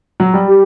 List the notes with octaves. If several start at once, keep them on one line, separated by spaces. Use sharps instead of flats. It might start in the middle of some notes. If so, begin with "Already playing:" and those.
F#3
G3
G4